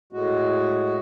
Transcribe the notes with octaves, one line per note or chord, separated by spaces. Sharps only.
A2 G#3 F#4